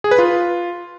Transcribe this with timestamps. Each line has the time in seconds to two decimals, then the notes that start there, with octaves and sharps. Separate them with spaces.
0.04 G#4
0.11 B4
0.18 F4